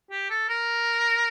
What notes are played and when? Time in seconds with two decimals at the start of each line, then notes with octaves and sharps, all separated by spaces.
0.11 G4
0.30 A4
0.49 A#4